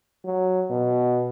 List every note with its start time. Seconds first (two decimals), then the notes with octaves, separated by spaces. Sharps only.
0.25 F#3
0.70 B2